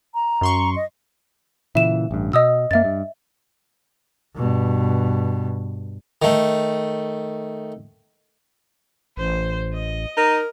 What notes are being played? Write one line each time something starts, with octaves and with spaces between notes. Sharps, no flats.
A#5
F#2 C6 C#6
D#5
A#2 C#3 E3 E5 E7
A1 G2
B2 D#5 D#6 E6
F#2 A#3 E5 A6
G2
G2 B2
D#3 A3
A1 C5
D#5
D#4 A#4